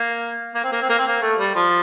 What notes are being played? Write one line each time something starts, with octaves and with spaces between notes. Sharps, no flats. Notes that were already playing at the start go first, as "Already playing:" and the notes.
Already playing: A#3
A#3
C4
A#3
C4
A#3
C4
A#3
A3
G3
F3